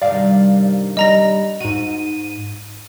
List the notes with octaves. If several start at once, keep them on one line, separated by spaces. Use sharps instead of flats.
G2 C3 D#3 D5 F5
G3 D#5 A#5 A#6
G#2 F#4 D#7